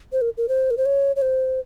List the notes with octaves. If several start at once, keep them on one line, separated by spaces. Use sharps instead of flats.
C5
A#4
A#4
C5
A#4
C5
C#5
C#5
C5